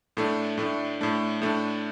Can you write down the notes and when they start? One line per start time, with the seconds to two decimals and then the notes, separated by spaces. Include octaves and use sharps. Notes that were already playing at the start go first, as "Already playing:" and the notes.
0.17 A2 A3 D4
0.58 A2 A3 D4
1.01 A2 A3 D4
1.42 A2 A3 D4